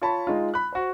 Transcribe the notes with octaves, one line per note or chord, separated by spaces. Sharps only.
F4 C#5 A5 B5
G#3 D#4 F4
B5 F#6
F#4 C5